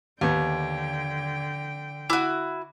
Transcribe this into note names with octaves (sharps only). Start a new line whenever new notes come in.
D#2 D3 B3 G5
E4 F#4 D6